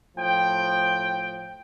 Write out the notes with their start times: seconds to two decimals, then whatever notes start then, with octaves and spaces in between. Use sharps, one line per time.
0.17 A2 F3 G5